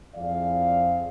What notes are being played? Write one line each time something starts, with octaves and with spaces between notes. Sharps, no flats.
F2 C4 E4 G#4 D5 F5